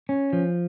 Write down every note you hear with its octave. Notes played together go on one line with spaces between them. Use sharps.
C#4
F3